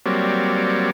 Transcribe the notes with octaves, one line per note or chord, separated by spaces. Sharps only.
F#3 G3 A#3 C4 C#5 D5